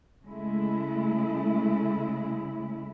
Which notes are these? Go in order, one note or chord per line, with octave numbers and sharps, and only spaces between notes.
C#3 G#3 A3 E4